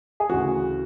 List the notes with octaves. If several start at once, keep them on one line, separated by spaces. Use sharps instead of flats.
G#4
D2 C#3 E3 F#4